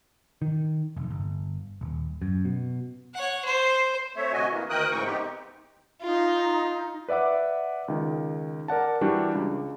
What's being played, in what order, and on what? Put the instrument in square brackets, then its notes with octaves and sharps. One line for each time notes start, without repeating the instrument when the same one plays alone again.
[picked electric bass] D#3
F1
G1
D#1
F#2
B2
[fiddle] C#5 F#5
C5
[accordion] A3 C4 C#5 E5
D2 C3 F#4 D#5 G#5
E3 A#3
D2 D#3 A#4 G5 D#6 F#6
G#2 C#3 E3 C4 G5 C#6
B3 C4 D#4 G4
[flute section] D#4 [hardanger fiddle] F4
[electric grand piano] B4 D5 E5 F#5 D6
C#2 D#3
A#4 D5 F#5 A5
E3 G3 D4 F#4 G4
C#2